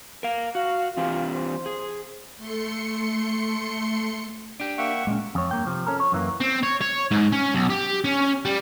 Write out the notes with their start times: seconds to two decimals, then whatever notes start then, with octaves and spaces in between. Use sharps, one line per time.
0.23 A#4 F5
0.55 F#4 F5
0.97 E3 C4 F4 G4
1.35 C5
1.66 G#4
2.36 A3 C6 C#7
4.60 D4 G4
4.78 A#3 E5 F#5 G5 C#6
5.07 A#2 G#3 C#4
5.35 F2 C#5
5.51 G2 A#3 G5
5.67 C3 F3
5.87 C#4 A4 A#4
6.00 C#5
6.12 F#2 E3 A#3
6.40 C4
6.63 C#5
6.81 C#5
7.11 G#2
7.32 C#4
7.55 B1
7.70 G4
8.04 C#4
8.45 G3